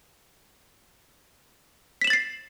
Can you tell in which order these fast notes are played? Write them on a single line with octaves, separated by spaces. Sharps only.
B6 E7 F#7 A6 C7